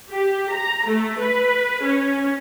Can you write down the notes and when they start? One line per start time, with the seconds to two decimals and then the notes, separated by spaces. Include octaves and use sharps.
0.11 G4
0.53 A#5
0.88 A3
1.21 B4
1.84 C#4